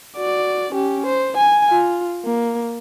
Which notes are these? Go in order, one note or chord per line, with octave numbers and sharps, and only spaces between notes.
F#4 D5
C#4 G4
C5
G#5
F4
A#3